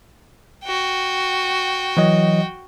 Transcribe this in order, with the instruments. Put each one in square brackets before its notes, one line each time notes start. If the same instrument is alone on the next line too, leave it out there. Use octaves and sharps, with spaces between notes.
[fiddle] F#4 G5
[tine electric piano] E3 F#3 D#5